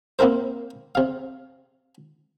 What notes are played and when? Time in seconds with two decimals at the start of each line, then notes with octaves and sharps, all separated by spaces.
0.19 A#3 C4 E4 A#4 C5
0.95 C3 F5